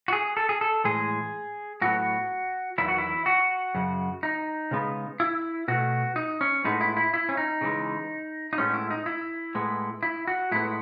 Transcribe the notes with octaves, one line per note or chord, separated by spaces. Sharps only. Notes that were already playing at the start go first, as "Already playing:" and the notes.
F#4
G#4
A4
G#4
A4
A2 E3 G#3 G#4
A2 F#3 B3 F#4
E2 D#3 F#3 E4
F#4
E4
F#4
F#2 C#3
D#4
C#3 G#3 B3
E4
B2 A3 F#4
D#4
C#4
A2 G#3 B3 D#4
E4
E4
E4
C#4
D#4
C#3 E3 G#3
D#4
A2 G#3 B3 C#4
E4
D#4
E4
A2 G#3 B3
E4
F#4
A2 G#3 B3 E4